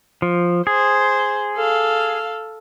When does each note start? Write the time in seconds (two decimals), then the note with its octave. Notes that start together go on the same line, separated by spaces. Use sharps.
0.22 F3
0.67 G#4 C5
1.56 A4 F5